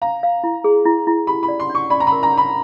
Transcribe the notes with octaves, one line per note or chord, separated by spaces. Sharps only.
F5 A#5
F5
E4
G#4
E4
E4
G4 B5
B5
D5
C6
D4
C#6
D5 B5
A#5
A#4 B5
A#5
D4 B5